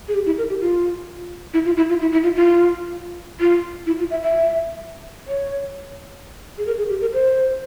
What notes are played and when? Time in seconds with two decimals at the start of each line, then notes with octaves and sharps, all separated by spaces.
0.08 G#4
0.14 G4
0.26 E4
0.38 A#4
0.49 G4
0.61 F4
1.54 E4
1.65 F4
1.77 E4
1.89 F4
2.01 E4
2.12 E4
2.23 F4
2.35 F4
3.40 F4
3.87 E4
3.99 F4
4.11 E5
4.22 E5
5.27 C#5
6.58 G#4
6.67 A#4
6.78 G#4
6.89 G4
7.01 A#4
7.13 C5